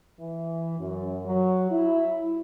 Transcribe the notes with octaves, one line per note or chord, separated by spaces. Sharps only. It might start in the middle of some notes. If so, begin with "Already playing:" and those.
E3
F#2
F#3
E4